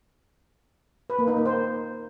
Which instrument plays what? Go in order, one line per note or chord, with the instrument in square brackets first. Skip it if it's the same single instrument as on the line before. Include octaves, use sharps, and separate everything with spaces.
[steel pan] B4
A#3
D#4
A#3
C5